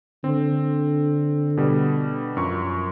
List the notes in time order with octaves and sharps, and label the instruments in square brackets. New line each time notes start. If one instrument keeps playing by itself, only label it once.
[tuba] D3 [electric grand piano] C4
[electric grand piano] B2 G3
F#2 F3 C#6